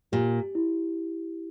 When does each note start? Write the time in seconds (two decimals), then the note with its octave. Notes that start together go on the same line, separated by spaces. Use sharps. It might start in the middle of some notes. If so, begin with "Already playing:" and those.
0.12 A#2 G4
0.55 E4